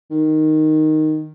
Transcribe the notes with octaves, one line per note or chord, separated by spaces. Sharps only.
D#3